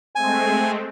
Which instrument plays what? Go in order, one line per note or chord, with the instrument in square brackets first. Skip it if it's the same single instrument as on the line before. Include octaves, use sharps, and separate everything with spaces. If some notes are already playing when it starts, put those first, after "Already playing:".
[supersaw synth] G#3 A3 C4 [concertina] G#5